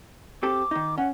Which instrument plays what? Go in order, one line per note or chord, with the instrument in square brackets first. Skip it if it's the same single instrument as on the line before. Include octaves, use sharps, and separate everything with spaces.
[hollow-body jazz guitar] C4 G4 A4 [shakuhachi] D6
[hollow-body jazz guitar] D#3 D#4
[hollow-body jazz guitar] C#4 [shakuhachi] F#5